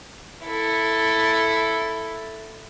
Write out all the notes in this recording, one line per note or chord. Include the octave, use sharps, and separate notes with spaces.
E4 A4